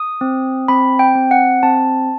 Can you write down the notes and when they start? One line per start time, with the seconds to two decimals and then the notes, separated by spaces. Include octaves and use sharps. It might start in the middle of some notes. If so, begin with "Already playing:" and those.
Already playing: D#6
0.21 C4
0.68 C4 B5
0.99 G5
1.15 C4
1.31 F#5
1.63 C4 A5